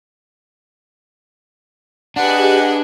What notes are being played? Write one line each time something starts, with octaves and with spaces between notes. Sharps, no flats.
D4 G4 G#4 B4 D#5 F#5 G#5